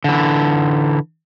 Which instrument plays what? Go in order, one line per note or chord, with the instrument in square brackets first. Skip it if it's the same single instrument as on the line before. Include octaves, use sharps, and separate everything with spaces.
[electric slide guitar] D3 E3